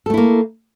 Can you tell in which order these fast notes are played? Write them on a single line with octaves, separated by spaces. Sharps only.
A4 A3 E4 A#3